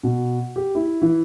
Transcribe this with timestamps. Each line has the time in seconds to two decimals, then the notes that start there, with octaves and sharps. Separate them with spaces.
0.03 B2
0.56 G4
0.75 E4
1.02 E3